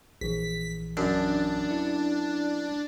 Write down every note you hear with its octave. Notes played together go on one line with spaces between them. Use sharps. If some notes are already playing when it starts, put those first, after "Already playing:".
A#1 E3 B6
F#2 D4
E4